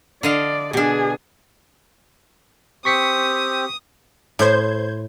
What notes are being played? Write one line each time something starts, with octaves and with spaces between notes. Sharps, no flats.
D3 D5 D#5 F5
B2 D4 G#4
C4 G4 C#6 D#6 B6 C#7
A2 C5 G6 G#6